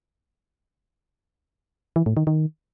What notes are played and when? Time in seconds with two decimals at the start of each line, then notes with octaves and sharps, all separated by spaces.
1.96 E3
2.06 A2
2.17 D#3
2.27 D#3